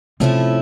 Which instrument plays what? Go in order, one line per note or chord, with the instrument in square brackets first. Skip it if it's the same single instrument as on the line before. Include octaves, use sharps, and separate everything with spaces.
[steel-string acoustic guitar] A2 F3 A3 C#4 E4 [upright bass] C3